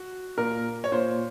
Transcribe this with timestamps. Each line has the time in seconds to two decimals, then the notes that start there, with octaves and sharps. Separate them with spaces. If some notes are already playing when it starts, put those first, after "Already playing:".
Already playing: F#4
0.38 A#2 A#4
0.84 C#5
0.92 A#2 C5